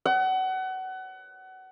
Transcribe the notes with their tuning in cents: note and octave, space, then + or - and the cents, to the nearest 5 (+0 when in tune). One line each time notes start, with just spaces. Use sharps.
F#5 +25